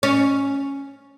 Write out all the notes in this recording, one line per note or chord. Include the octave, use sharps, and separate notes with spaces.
C#4